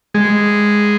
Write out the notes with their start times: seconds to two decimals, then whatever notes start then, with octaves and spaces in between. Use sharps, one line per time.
0.15 G#3